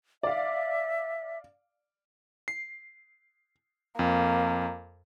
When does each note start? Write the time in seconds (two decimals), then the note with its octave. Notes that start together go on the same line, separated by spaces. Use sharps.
0.23 D5 E5 F5
2.48 C7
3.99 F2 A#3